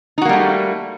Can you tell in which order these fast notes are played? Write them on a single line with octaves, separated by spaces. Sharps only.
D#4 F#4 A#3 G3 A3